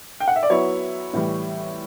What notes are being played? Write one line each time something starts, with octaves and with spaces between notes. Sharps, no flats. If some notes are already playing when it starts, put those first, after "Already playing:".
G5
F#5
E5
D5
F#3 B3 E4 C#5
A2 E3 G3